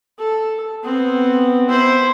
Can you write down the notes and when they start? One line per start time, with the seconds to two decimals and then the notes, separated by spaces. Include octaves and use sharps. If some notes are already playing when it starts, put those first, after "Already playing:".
0.19 A4
0.83 B3 C4
1.69 E4 C5